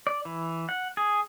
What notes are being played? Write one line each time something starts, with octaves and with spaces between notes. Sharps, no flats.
D5
E3
F#5
G#4